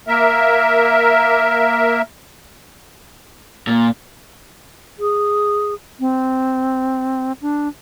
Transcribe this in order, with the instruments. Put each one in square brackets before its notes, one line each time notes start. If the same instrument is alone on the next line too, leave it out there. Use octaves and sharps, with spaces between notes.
[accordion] A#3 A#4 E5
[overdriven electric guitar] A#2
[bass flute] G#4
C4
D4